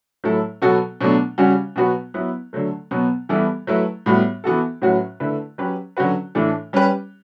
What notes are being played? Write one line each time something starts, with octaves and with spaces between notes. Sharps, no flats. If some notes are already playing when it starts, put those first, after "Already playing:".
A2 F#3 A3 E4 A4
B2 F#3 B3 F#4 A4
B2 F#3 A3 D4
C#3 G3 C#4 F#4
B2 F#3 B3 F#4 B4
F#3 B3 E4 B4
D3 F#3 A3
B2 F#3 B3
E3 G3 B3 E4 A4
F#3 A3 E4 B4
A2 G3 B3 F#4
E3 B3 F#4 A4
A2 F#3 C#4 F#4 B4
D3 A3 E4 B4
F#3 C#4 G4 B4
D3 F#3 C#4 F#4 B4
A2 E3 A3 D4 A4
G3 C#4 G4 B4